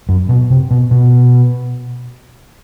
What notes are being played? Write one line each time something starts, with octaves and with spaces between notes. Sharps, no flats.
F#2
B2
C3
B2
B2